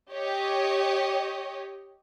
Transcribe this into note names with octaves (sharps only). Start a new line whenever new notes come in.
G4 C#5 D#5